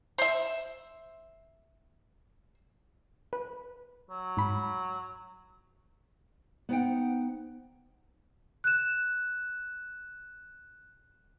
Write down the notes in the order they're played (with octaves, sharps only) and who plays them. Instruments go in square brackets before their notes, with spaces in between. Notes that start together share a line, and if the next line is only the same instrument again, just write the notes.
[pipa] C5 E5
[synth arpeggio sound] B4
[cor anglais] F#3
[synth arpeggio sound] G#2 B5
[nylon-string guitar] B3 D#4 C5 D#5 F#5 G5
[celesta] F#6 E7